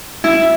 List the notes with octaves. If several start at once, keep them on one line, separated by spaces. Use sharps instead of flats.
E4